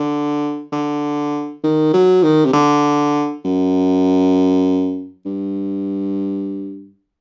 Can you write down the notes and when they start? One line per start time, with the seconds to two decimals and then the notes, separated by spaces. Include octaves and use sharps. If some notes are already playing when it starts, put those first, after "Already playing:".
Already playing: D3
0.72 D3
1.63 D#3
1.93 F#3
2.23 D#3
2.45 C3
2.53 D3
3.44 F#2
5.25 G2